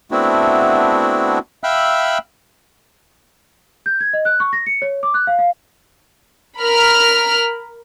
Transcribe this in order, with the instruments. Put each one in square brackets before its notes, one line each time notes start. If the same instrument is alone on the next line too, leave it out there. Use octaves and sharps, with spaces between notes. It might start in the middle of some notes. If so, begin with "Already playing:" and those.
[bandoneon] A3 B3 C4 D4 E4 F#4
E5 F5 G5 B5 E6 F#6
[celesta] G6
G#6
D#5
F#6
C#6
A#6
C#7
C#5
D6
F#6
F5
F5
[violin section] A#4 B5 F6